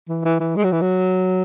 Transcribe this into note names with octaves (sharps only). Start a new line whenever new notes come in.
E3
E3
E3
G#3
F#3
E3
F#3